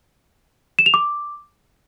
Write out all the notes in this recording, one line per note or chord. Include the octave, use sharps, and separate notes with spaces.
E7
F7
D6